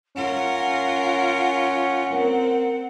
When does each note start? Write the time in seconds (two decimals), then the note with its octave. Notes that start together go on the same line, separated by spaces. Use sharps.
0.16 C#4 F4 A#4 F#5
2.14 C4 A#4